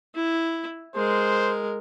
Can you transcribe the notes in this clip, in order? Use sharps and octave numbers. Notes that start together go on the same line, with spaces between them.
E4
G#3 A#4 C5